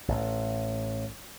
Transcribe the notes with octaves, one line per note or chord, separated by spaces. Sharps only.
A1